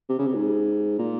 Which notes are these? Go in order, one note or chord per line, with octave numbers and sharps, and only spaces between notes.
C3
C#3
C3
G#2
A#2